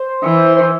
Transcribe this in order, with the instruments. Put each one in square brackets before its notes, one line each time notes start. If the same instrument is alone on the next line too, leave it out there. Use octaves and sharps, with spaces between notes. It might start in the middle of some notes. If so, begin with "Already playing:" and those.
Already playing: [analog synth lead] C5
[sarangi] E3
[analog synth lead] C5